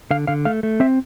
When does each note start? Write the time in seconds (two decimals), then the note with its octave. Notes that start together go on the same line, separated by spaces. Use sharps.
0.11 D3 F5
0.27 D3 F5
0.45 A3 F5
0.63 A3
0.80 C4 E5